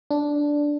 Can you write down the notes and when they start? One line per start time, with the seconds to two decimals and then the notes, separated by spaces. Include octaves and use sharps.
0.11 D4